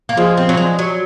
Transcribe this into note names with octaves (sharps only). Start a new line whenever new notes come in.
A#3
F3 G#3
C4
F#3
G#3
F#3